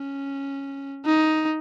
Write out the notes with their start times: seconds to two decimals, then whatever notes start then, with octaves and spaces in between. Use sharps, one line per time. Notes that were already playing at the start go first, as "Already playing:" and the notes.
Already playing: C#4
1.06 D#4